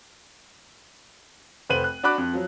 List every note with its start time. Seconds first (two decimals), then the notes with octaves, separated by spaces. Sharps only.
1.70 F1 B4 C5 D#7 F#7
1.84 F#6
2.03 D4 F#4 B5 D6 F#6
2.18 F2
2.34 F3 F#3